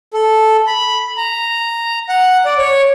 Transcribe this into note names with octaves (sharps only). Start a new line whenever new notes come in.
A4
B5
A#5
F#5
D5
C#5